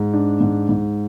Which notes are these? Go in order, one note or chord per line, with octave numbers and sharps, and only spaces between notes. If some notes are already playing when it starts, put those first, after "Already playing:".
Already playing: G#2
D4
G#2
G#2